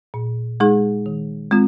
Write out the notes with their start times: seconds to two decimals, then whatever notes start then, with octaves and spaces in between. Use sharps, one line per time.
0.14 A#2
0.60 G#3 D#4 G#4
1.06 D#3
1.51 G#3 C4 F4